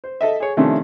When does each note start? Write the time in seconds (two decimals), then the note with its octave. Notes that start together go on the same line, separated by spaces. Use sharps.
0.04 C5
0.21 A4 D#5 E5
0.40 G#4 C#5
0.57 C3 D#3 F3 A3 C#4 D4